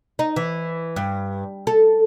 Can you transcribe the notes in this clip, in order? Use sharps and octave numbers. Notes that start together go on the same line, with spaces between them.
D#4
E3
G2
A4